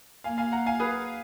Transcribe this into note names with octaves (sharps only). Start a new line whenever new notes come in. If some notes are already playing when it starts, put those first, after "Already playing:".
A#3 F5 G#5
F5 G#5
F#5 A#5
F5 G#5
G#4 B4